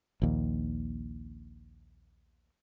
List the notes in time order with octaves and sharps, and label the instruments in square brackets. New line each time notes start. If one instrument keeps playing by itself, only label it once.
[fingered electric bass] A#1 D#2